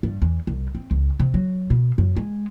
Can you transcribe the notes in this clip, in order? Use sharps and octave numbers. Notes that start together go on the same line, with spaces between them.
G2
E2
C2
C4
C#2
C3
F#3
B2
F#2
G#3